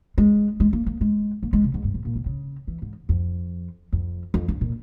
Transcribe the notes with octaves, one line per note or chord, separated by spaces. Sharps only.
G#3
G#3
A#3
A#3
G#3
A#3
G#3
C3
G#2
G2
G#2
A#2
C3
C#3
E3
G#2
F2
F2
F2
G2
A#2